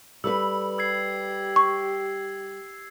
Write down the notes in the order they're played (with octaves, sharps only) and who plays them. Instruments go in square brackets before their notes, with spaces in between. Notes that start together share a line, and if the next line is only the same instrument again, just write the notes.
[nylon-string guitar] G3 A4 B4 [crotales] E6
[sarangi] G4 [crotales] E6 G#6 C7
[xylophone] C#6